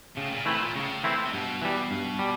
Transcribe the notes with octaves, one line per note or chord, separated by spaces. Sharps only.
A2 C#3
A#2
A2 E3 A3 C4 E4
A#2
A2 C#3
E3 A3 C4 E4
C3
G2 B2
E3 G3
G2
G3